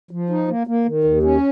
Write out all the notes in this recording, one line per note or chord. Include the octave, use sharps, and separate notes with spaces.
F3
D#4
A#3
A#3
D#3
D#2
C#4